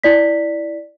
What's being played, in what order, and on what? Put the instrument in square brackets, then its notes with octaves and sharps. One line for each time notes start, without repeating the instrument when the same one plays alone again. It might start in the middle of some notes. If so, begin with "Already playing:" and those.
[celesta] E4 D5 B6